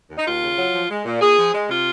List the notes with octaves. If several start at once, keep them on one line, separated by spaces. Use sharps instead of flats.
D#2
D#4
D#2 F4
C#3
F#3
F3
G#3
A#2
A#2 G#4
F3
G#3
C3 F4